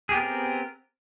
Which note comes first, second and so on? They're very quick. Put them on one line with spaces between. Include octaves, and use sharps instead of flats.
G#4 G4 B3 A#4 C4